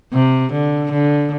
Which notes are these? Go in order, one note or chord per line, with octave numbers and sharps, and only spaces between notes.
C3
D3
D3